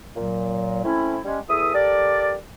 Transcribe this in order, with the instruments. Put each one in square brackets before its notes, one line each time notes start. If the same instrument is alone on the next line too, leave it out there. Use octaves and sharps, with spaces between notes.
[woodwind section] A#2 F#3
A3 C4 C#4 E4
G3 G#3 C#4
E2 E3 A4 E5 D#6
G4 A4 A#4 D5